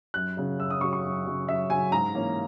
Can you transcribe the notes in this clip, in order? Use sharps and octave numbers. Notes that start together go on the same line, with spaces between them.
F#2 F#6
C#3 F#3
F#2 E6
D#6
C#3 F#3 C#6
C#6
F#2
C#3 F#3
F#2 E5
C#3 F#3 G#5
G#2 A#5
E3 A#3 C#4